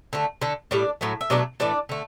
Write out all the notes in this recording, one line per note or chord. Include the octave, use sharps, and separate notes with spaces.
D3 A3
D3 A3
A2 G3 D4 D5
A2 F#3 A3
E5
B2 F#3 A3 D4 D5
A2 E3 A3 D4 D5
D3 A3